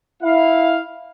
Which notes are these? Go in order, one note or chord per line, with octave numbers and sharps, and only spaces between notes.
E4 F5